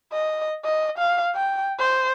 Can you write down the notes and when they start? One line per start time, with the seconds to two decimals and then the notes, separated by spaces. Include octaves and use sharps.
0.13 D#5
0.65 D#5
0.98 F5
1.35 G5
1.79 C5